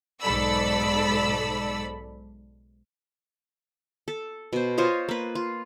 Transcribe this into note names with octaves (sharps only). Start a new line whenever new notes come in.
B1 G#2 A4 D5 B5 E6
A4
B2 C5
F4 C5 C#5 D#5
A#3 B4
F4